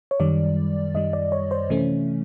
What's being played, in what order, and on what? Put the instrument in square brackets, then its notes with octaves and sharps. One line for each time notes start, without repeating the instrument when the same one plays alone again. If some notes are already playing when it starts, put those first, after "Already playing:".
[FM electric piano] C#5
F#2 D#3 G3 D5
F#2 D#3 G3 D#5
D5
C#5
C5
C3 E3 A3 C#4